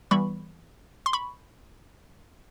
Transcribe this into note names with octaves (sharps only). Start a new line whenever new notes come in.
E3 G3 B3 B5 C#6
C6
B5 C#6